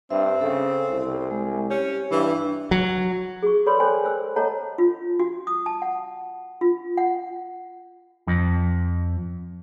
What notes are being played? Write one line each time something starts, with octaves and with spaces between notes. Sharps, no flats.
G2 C4 E5
C#3 A4
C2
G#3
C#4 G4
G2 E3 D4
F#3
G#4 C#6
A4 B4 C#5 D5 B5 C6
A4 C5 C#5 G5 G#5 C6
A#4 C5 E6
A4 C#5 D#5 F#5 A5 A#5
F4
F#4
D#6
A5
F#5
F4
F#5
F2